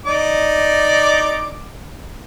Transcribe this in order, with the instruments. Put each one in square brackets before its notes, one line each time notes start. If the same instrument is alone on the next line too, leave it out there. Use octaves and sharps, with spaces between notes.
[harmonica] D#4 D5 D6